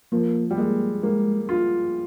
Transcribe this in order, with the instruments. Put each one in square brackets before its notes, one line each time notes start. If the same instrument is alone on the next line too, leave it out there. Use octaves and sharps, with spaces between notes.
[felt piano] F3 [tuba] A#3
[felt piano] G3
[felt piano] G#3 [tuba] A#3
[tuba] G#3 [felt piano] A#3
[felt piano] F4